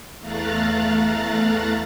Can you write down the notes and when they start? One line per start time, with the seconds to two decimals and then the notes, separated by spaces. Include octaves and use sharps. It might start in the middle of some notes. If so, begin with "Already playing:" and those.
0.20 E2 A3 F5 A#5 F#6 A6